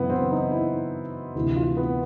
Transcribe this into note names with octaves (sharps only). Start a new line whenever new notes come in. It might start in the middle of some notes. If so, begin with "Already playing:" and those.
Already playing: F#2 C#3 E3 B3 E4
C4
D#4
E4
D2 C3 E3 E4
F4
B3